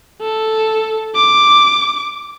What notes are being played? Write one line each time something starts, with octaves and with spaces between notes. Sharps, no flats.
A4
D6